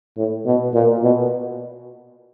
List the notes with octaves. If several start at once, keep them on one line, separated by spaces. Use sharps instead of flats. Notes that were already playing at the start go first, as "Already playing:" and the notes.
A2
B2
A#2
B2